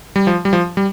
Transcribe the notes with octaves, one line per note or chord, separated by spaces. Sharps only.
G3
F3
G3
F3
G3